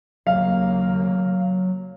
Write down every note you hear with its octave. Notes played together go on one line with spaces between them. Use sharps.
D#2 C#3 F#3 A#3 F5